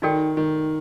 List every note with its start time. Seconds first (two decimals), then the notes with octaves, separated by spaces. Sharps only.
0.02 D#3 D#4 F#4 A4 D5 G5
0.37 D#3